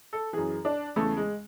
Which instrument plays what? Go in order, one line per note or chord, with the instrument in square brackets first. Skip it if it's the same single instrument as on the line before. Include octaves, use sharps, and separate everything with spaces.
[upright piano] A4
F#2 E3 G#4
D4
E2 C#3 E3 A3
G#3